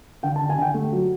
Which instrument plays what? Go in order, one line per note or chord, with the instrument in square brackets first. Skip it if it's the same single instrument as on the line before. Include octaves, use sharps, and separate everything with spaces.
[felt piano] D3 G5
D3 A5
G#5
D3 G5
A3
F#3